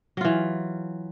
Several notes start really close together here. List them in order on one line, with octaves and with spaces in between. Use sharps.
F#3 F4 E3